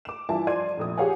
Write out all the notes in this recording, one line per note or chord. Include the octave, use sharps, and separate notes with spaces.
D6 E7
G2 E3 F4 E5 G#5 A5
F3 D5 C6 G#6 D#7
F1 A#1 D#6
G4 G#4 C#5 F5 F#5 G#5